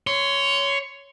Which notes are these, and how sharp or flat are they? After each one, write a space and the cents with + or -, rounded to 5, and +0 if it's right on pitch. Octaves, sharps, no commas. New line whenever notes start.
C#5 +10 C6 -15